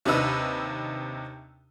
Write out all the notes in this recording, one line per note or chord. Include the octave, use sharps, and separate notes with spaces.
D#2 C3 D4 D#4 B4 E6